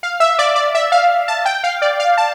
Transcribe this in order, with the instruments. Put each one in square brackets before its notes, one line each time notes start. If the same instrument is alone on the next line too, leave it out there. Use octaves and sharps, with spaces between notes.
[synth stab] F5
E5
D5
D5
E5
F5
A5
G5
F5
D5
F5
A5